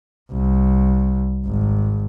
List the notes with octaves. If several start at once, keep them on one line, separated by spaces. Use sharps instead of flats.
C2
G#1